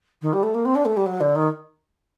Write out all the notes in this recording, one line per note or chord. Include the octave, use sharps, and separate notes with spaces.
D#3
G3
A3
A#3
C4
D4
A3
G3
F#3
D3
D#3